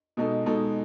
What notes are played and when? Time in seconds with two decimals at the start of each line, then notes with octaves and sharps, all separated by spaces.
0.17 B2 G#3 D#4 A4
0.46 B2 G#3 D#4 A4